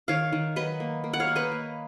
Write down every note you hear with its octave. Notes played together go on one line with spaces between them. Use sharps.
D#3 C#5 F5
D#3
F#3 B4 D#5
A#3
A#3
F#5
C#5 F5
A#3
B4 D#5
A#3